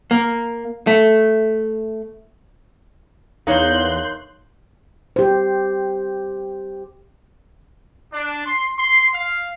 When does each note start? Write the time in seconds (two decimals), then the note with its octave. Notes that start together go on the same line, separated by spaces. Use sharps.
0.11 A#3
0.87 A3
3.47 E2 A#3 D#4 C#5 C6 F#6 G6
5.16 G4 C5
8.13 D4
8.46 C6
8.77 C6
9.14 F5